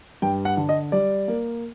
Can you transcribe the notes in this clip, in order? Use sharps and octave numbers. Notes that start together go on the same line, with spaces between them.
G2 G5
F#5
D3
D#5
G3 D5
A#3